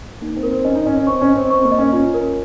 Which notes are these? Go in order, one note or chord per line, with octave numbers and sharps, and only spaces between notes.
A#3 D#4
C4
A#4
C4
C#4 D#5
D#4
C#4 D#5
C#4
C4 C#6
C#4
D#5
C4
C4 C#6
A#3
D#5
C#4
C#4 F4
A#4